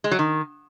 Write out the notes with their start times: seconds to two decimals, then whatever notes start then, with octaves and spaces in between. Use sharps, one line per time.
0.04 G#3
0.11 F#3
0.19 D#3